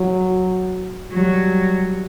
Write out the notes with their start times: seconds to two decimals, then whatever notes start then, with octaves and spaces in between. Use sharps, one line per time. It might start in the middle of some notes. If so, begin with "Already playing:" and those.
Already playing: F#3
1.12 F#3 G3